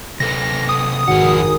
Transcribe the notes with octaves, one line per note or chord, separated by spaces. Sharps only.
C3 A4 B4 A#6
D#6
G#1 F2 F#4 F#5